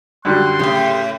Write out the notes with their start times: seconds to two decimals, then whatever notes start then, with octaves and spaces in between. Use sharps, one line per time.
0.25 F#2 D3 G3 C6 F#6
0.59 F2 A2 C#3 G4